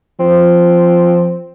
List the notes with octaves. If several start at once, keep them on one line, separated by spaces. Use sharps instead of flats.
F3 C4